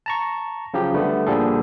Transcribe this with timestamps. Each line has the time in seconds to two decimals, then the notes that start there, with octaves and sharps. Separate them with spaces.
0.06 A5 A#5 C#6
0.74 C#3 F3 F#3 G4
0.94 D3 G3 A3 B3
1.27 A#2 D3 F3 G3 G#4 A4